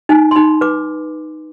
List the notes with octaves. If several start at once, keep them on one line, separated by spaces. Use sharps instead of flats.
D#4 G#5
C6
D#4 B5
B4 D6